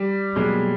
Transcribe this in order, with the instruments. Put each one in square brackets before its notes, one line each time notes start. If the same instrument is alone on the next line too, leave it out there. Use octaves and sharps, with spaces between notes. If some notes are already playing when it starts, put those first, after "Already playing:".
Already playing: [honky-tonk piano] G3
[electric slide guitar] B2 F#3 A#3 [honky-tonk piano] G#3